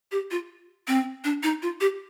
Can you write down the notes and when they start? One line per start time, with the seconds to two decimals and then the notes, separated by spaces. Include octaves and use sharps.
0.12 G4
0.31 F4
0.88 C4
1.24 D4
1.43 D#4
1.62 F4
1.81 G4